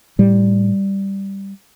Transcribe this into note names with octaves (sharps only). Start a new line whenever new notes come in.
A2 G3